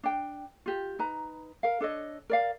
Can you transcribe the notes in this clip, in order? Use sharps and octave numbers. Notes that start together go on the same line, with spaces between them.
D4 G5
F4 G4
D#4 B4 A#5
A#4 F5
D4 A4 C#5 D#5
A#4 D5 F5